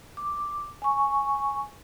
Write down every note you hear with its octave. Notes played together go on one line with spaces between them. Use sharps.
D6
G#5 C#6